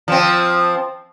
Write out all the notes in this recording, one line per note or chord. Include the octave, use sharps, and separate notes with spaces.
F3 C4